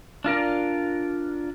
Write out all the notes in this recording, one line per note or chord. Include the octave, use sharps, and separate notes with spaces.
D4 F4 A#4 D5